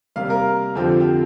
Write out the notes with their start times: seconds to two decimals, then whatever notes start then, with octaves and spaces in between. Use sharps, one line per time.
0.16 C3 G3 A#3 F5
0.30 A#4
0.75 F2 D3 F3 C4 G4
1.00 G4